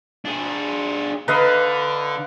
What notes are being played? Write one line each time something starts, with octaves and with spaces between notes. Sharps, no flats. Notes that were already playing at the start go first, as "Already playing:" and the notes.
D4 G#4
D3 B4 D#5 F5